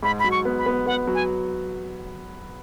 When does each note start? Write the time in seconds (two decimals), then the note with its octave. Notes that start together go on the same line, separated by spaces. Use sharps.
0.03 G#2 B5
0.19 F#3 B5
0.31 C#6
0.45 B3
0.59 B5
0.66 B3
0.86 B3 F#5
1.07 F#3
1.15 G#5